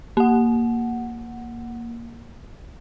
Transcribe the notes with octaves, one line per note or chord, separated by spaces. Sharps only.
A#3 F#5